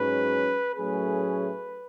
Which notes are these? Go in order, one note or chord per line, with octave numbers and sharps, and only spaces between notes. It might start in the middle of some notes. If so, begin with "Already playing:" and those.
Already playing: G#2 F#3 C#4 B4
A2 F#3 A3 C#4 G#4 B4